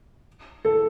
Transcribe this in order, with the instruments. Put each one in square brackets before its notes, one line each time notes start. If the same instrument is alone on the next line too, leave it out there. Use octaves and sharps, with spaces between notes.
[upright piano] A4